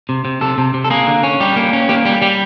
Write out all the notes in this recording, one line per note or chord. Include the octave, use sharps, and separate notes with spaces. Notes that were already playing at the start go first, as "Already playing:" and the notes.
C3
C3
C3 A4
C3
C3
A4
A#3 G#4
D3
C#4
G3 G4
A#3
C#4
A#3 G4
G3 G4
G3 G4